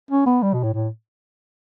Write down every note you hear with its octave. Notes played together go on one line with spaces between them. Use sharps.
C#4
B3
G3
B2
A2
A2